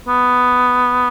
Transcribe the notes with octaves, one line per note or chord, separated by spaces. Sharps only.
B3